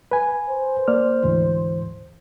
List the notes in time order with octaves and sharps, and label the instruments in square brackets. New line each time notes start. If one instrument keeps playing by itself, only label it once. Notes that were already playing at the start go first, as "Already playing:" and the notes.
[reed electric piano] B4 G#5
[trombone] C5
[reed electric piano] A#3 D5 F6
D2 G#2 E3